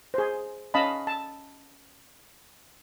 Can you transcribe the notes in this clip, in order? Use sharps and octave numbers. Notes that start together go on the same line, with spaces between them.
G#4 C5
C#4 D#5 F5 A5 B5
A5